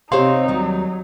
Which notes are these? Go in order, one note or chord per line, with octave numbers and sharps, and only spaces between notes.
C3 C4 D#4 G4 C5 C#5 F5 C6
D#2 F#3 G3